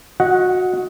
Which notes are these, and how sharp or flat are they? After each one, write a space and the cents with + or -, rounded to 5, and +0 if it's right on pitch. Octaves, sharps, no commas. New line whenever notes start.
F#4 -20 D#5 +20 F#5 -5